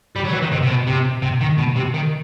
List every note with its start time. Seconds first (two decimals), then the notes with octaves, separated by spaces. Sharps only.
0.16 G3
0.24 F#3
0.33 E3
0.42 D#3
0.52 C3
0.63 C3
0.69 B2
0.87 C3
1.22 C3
1.41 D#3
1.58 B2
1.76 C3
1.94 D#3